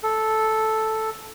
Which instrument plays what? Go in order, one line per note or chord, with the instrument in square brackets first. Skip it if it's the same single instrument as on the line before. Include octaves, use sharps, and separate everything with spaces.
[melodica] A4